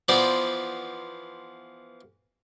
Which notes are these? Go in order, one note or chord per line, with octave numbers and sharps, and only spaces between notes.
E3 F3 B3 C5 D5